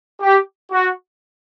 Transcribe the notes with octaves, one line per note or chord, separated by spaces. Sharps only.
G4
F#4